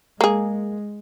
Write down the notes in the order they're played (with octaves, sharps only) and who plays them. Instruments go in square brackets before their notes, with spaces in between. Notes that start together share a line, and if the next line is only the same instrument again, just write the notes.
[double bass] G#3 [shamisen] A#3 G#4